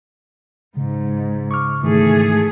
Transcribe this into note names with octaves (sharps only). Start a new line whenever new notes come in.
G#2 C#3
C#6 D6 F6
G#2 D#3 E3 A3 G#4